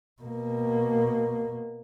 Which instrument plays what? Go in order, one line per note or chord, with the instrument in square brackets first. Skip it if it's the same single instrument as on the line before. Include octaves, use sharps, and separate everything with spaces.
[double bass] B2 A#3